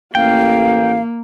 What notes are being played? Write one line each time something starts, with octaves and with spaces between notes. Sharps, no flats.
A1 A#3 F5 G5